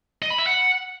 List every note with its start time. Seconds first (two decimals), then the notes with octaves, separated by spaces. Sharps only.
0.22 D#5
0.30 B5
0.38 E5
0.47 F#5